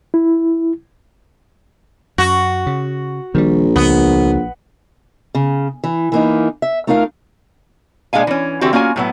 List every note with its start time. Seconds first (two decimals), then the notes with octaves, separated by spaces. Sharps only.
0.14 E4
2.18 F#2 F#4
2.67 C#3
3.35 A#1 D#3 F3 G3
3.76 C#2 B3
5.35 C#3
5.84 E3
6.12 E3 A#3 D#4
6.62 E5
6.87 A3 D#4 F4 A#4 F5
8.13 A#2 G#3 D4 F5 G#5
8.27 E3 C#4
8.61 D3 E3 C4 F#4 G4
8.73 A#3 C#4 F4 F#4 F#5 G#5
8.96 A2 F#3 B3